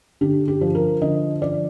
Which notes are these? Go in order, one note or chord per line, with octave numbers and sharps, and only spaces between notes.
D3 G4
G4
F3
A#4
D3 D#5
F3 D5